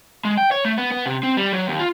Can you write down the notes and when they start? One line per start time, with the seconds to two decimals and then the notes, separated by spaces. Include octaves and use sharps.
0.25 G#3
0.37 G5
0.51 C#5
0.65 A3
0.78 B3
0.91 B3
1.06 C3
1.23 C4
1.37 G3
1.53 F#3
1.67 D#2
1.79 F4